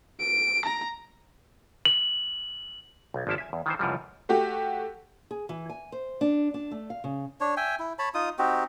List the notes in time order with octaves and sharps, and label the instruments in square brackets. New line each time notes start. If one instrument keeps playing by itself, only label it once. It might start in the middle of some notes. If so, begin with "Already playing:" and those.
[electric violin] D7
A#5
[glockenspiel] F#7
[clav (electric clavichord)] B1
G#1 F3 A#3 E4 A5
E5 G#5
E2
D#3 E3 C5
C#2 F#2 E3 F3 G3
[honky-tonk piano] A3 F#4 G4
[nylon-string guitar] G#4
E3
G#5
C5
D4
D4
A3
F5
C#3
[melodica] D4 C#5
E5 G5 G#5
E4
C#5 A5 B5
D#4 F4 D#6
C4 D#4 F#4 G4